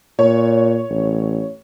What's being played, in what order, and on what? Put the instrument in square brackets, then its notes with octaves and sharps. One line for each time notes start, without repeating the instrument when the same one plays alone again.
[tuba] A#2 [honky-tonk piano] C#5
[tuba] A1